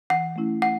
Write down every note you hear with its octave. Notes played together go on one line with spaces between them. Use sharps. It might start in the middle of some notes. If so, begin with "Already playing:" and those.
E3 F#5
A3 C#4 E4
F#5